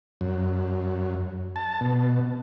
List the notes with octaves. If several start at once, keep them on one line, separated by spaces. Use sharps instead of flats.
F#2
A5
B2